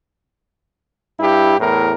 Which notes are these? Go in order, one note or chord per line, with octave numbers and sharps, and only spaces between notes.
G2 E4 G4
E2 A2 A#4